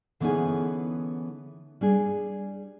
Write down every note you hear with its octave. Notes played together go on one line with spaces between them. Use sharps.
D3 E3 B3 C#4 D#4 G#4
G3 D4 G#4